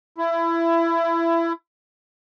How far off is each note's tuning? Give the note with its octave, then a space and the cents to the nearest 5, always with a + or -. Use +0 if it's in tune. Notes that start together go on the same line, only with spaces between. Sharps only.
E4 +20